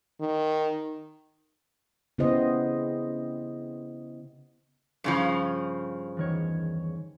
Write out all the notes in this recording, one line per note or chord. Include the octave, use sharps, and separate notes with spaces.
D#3
C#3 B3 E4 G4 C5 D#5
G2 C#3 F3
E2 D#3 C#5